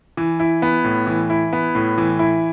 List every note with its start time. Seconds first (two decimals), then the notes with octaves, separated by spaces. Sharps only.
0.17 E3
0.40 E4
0.62 B3
0.84 A2
1.07 E3
1.30 E4
1.53 B3
1.75 A2
1.98 E3
2.19 E4